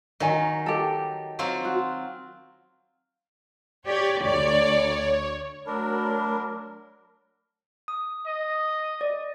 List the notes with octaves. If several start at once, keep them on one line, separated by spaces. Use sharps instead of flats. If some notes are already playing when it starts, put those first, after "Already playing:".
D#3 F#3 D#5 G#5
G4 A4
F#3 C4 F4
F#4
G4 C#5 D5
D2 C#5 D5
F#3 A3 D4 A#4 B5
D#6
D#5
D5